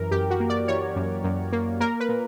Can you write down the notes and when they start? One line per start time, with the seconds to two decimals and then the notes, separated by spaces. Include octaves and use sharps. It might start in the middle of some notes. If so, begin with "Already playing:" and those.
Already playing: F#2 E3 A#4
0.11 F#2 G4
0.31 F#4
0.40 A#3
0.50 D5
0.68 E3 C#5
0.96 F#2
1.24 F#2
1.53 A#3
1.80 A#3 A#4
2.00 B4
2.09 A#2